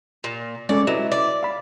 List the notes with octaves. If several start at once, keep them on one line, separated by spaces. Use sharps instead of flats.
A#2
G#3 C#4 A4 D5
F#3 E4 B4 D#5
D5
F5 B5